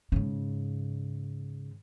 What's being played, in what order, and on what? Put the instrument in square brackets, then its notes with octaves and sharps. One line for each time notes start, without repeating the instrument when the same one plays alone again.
[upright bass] G#2 C#3